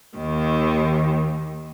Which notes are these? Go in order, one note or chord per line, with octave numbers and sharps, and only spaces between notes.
D#2 D#3